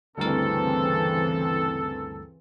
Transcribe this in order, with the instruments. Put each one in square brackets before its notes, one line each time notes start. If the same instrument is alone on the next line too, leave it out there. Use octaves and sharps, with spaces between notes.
[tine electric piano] D2 G2 A#4 [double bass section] C#3 E3 C4 [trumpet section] A4